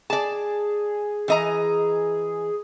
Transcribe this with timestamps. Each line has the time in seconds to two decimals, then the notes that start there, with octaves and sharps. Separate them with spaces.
0.10 G#4 D5 A5
1.28 E3 D#5 A#5